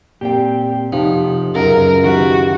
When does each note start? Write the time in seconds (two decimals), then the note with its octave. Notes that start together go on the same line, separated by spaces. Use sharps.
0.21 A#2 C4 G4 G5
0.92 F2 C3 F3 D#4 G4
1.55 C#2 F#2 F#3 C#4 A#4
2.04 D#3 E4 F#4 G4 B4